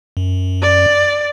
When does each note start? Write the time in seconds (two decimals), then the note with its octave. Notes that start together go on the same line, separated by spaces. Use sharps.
0.17 F#2
0.62 D5